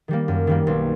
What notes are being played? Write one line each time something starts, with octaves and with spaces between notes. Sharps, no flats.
D#3 G3 A#3
F#2
D#3 G3 A#3
B1